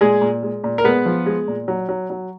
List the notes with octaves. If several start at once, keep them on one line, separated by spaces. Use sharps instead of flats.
A#2 G#3 G#4
A#2
G#3
A#2
A#4
G#3 B3 B4
F3
G#3
A#2
F#3
F#3
F#3